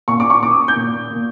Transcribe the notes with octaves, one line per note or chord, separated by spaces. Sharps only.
A#2 C#6
D6
C#6
A#2 D6
D#6
G6
A#2
A#2